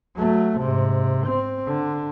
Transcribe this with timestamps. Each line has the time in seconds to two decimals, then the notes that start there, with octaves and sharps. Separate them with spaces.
0.16 F#3 A3
0.58 G#2 C3
1.27 C4
1.66 D3